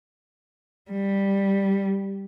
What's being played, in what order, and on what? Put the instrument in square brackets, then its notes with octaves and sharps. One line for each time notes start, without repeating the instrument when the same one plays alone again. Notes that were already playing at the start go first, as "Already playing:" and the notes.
[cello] G3